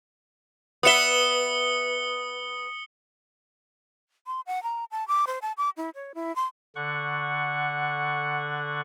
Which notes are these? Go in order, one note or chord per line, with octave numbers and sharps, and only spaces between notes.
B3 E5 D#6 C#7 G7
C6
F#5
A#5
A5
D6
C5
A5
D6
E4
C#5
E4
C6
D3 F#5 C#6